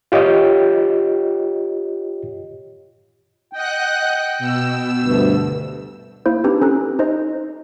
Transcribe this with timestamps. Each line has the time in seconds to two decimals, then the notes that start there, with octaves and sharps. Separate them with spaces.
0.12 F4 G4 C#5 D#5 G5
3.53 D#5 F#5 G5 F#6
4.39 B2 E6
5.01 D2 G2
6.26 A#3 E4 C5
6.44 C4 D4 D#4 G4 B4
6.61 C#4 A4 A#5 F#6
6.99 D#4 C5 D#5